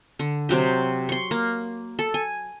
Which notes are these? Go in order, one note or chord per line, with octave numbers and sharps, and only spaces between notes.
D3
C3 F#3 G4
C6 C#6
A#3
A4
G#5